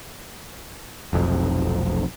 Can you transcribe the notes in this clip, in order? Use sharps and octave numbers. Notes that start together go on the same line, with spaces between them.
F1 B1 F2